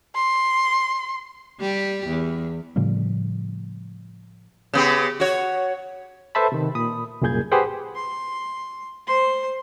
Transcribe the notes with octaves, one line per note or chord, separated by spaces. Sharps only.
C6
G3 G4
E2
A2 C#3 F3 G3
C#3 B3 G4
F#4 C#5
A4 B4 C5 E5 A5 B5
C3 D#3
A#2 B5 D#6
C2 F#2 A#2 G#4 G6 G#6
G4 G#4 B4 C5 F#5 G5
C6
C5 C6